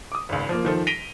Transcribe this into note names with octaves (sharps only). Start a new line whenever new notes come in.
D6 D#6
G#1 C#2
F3 A#3
D#3 F3 A4
A#6 B6 D7 D#7 F7 G7